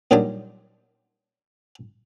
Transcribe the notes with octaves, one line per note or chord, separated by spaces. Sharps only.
A#2 D#3 F#3 G3 D4 D6